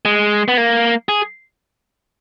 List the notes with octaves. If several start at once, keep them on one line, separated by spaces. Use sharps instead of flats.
G#3
B3
A#3
G#4